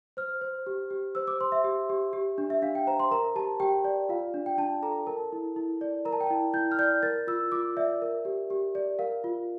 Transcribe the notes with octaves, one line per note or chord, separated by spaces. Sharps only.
C5 F6
C5
G4
G4
C5 E6
D6
C5 C6
E5
G4
G4
G4
D4
E5
D4 F5
G5
C5 A#5
C6
A#4 A#5
G4 A5
G4 G5
D5
F4 F5
D4
G5
D4 A5
A4 A#5
A#4 A5
E4
E4
D5
A#4 A#5
A5
G5
E4 A5
E4 G6
F6
D5 G6
A#4 A6
F4 E6
F4 D6
D5 E5
A#4
G4
G4
D5
A#4 F5
F4